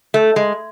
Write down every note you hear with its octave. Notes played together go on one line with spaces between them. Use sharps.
A3
G#3